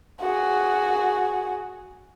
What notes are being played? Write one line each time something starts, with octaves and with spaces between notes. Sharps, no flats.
F#4 G#4